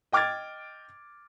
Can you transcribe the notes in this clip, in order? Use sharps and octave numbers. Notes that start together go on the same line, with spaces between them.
D#5 G5 D6 F6 G#6 A6